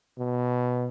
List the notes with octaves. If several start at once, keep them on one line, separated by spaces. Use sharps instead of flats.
B2